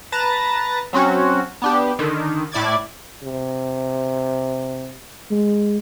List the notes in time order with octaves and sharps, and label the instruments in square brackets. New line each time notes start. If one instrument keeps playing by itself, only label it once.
[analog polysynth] B4 A5 A#5 A6 A#6
F#3 C4 C#4 F#4
B3 D4 G4
D3 D#3
A2 E4 D5 D6 G#6 A6
[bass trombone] C3
[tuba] G#3